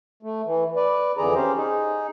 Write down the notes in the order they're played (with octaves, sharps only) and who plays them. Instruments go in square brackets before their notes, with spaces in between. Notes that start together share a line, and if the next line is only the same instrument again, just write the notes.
[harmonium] A3
E3
B4 D5
F2 D3 E3 G#4 D5 A#5
C#4 G4 C5
D#4 G#4